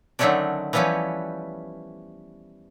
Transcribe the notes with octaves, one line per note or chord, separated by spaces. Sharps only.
D3 D#3 F#3 A3 C#4 D4
E3 F3 G3 B3 C#4